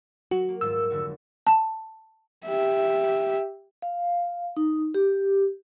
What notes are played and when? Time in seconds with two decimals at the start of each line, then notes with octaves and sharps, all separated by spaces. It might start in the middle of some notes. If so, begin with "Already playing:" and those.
0.31 F#3 F#4
0.49 A#3
0.61 D#1 G#2 F4 E6
0.90 F1 D3 F#4
1.47 A5
2.46 G4 E5
3.82 F5
4.57 D#4
4.94 G4